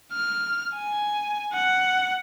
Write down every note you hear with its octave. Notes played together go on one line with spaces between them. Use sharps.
F6
G#5
F#5